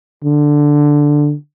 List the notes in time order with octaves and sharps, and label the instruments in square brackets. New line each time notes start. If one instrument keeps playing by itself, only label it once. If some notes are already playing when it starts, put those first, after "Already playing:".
[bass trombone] D3